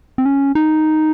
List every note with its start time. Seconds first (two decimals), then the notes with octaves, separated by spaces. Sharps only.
0.18 C4
0.26 C#4
0.55 D#4